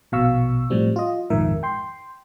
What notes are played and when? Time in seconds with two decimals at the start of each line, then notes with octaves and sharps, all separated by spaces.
0.12 A#1 B2 F5 C#6 E6
0.70 A2 F3 G3 C4
0.96 F4 D#5
1.30 A#1 F2 G#2 D#3 A#4 E5
1.63 G5 C6